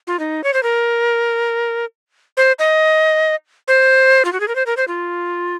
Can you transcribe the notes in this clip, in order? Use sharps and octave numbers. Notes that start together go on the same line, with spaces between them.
F4
D#4
C#5
C5
A#4
C5
D#5
C5
F4
F#4
G#4
A#4
C5
A#4
C5
F4